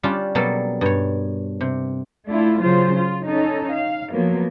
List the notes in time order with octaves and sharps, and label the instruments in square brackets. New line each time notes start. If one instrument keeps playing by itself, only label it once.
[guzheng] G3 C#4 D4 F4 G4
B2 F#3 G3 A#3 A4 A#4
G2 C#5
C3
[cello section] A3 D4 E4 F4
C#3 F#3 F4 C5
F4
C#4 D#4 A4
F5
F3 F#3 A#3 B3